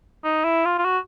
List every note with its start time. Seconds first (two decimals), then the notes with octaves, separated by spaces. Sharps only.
0.24 D#4
0.44 E4
0.65 F4
0.78 F4
0.85 F#4